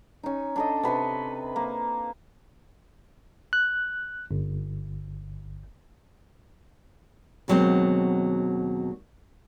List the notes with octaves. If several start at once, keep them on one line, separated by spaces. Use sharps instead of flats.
C#4 D#4
D4 A4 D#5
C3 B4 C6 C#6
A#3
F#6
G1
D#2 B2 F#3 G#3 C4